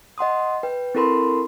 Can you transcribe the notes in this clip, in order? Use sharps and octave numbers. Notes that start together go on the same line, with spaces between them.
D#5 F#5 C6 D#6
B4 G5
C4 E4 A4 A#4 B5 C6